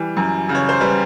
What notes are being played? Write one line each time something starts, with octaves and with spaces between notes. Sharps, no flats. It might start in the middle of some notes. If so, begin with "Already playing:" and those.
Already playing: E3 G3
F#2
C#3
C#5
C5
G3 B4